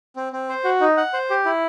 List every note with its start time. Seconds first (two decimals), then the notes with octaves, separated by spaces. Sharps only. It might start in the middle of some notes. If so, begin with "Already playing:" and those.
0.16 C4
0.33 C4
0.49 C5
0.64 F#4
0.81 D#4
0.97 F#5
1.13 C5
1.30 G4
1.45 E4